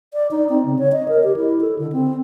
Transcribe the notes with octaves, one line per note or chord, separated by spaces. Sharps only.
D5
D#4
C4
C#3
C#5
D#5
A#4
G4
E4
A4
D3
C4